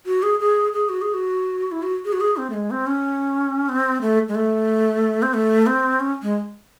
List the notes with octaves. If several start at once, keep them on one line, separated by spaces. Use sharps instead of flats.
F#4
G#4
G#4
G#4
F#4
G#4
F#4
E4
F#4
G#4
F#4
G#4
C4
A3
G#3
C4
C#4
C4
A3
G#3
A3
C4
A3
C4
C#4
G#3